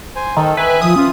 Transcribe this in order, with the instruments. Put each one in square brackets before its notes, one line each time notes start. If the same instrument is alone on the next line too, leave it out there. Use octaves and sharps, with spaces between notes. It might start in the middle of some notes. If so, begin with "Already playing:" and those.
[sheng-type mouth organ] C5 G#5
[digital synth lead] D#3 [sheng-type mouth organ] A4
[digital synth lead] B4 [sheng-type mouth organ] E5 G#5
[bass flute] F3 [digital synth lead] D#6
[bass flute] C#4 [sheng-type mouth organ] F4